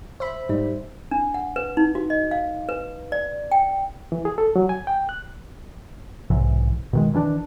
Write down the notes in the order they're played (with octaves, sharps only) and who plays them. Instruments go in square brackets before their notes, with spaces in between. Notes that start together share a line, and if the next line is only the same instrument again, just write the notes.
[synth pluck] C5 E5 B5
[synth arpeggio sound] G#2 D#4 [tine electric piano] G3
[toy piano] D4
F#5
B4
D#4
F#4
D#5
F5
B4
D5
G5
[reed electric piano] E3
G#4
A4
F#3
G#5
G5
F#6
[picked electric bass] B1 G#2 C3 E3
B2 D#3 G#3
D#3 E3 C#4 D4